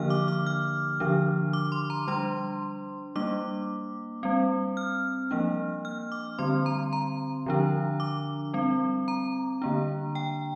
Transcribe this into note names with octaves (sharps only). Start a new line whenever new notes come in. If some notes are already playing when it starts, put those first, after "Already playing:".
Already playing: D3 F3 A#3 D4 F6
D6
D6
F6
D3 F3 D4
D6
C6
A#5
G3 D4 C6
G3 A#3 D4 D6
G3 C4
F6
F3 A#3 D4
F6
D6
D3 G3 C4 C6
A#5
A#5
D3 F3 D4
D6
G3 C4
A#5
D3 A#3 D4
G5